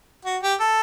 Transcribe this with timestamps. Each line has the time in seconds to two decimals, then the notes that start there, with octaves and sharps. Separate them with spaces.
0.25 F#4
0.42 G4
0.60 A4